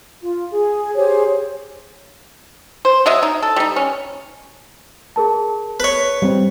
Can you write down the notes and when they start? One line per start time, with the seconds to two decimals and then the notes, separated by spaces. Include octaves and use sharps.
0.22 F4
0.51 G#4
0.96 G4 G#4 C5 C#5
2.85 C5
3.06 F#3 D#5 E5
3.23 D#4
3.43 A4
3.56 G3 D#4
3.76 C#4
5.16 G#4 A#4 A5
5.80 B4 C#5
6.22 G3 C4